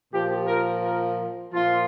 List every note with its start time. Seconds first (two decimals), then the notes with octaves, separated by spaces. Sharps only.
0.12 A#2 F3 G4
0.47 A#4
0.82 A#4
1.52 A#2 F3 F4